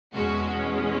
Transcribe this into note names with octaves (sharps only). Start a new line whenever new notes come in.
E2 B2 G#3 C#4 F#4